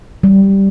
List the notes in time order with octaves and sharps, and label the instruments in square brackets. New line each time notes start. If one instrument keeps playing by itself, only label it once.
[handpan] G3